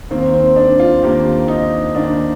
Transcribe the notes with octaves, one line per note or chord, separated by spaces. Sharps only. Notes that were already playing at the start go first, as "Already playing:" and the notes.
D#2 D#3 A#3 C4
C4
D4
F4
D#2 D#3 A#3 G4
D#4
D#2 D#3 A#3 D4